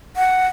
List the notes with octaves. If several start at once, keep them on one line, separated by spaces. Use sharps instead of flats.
F#5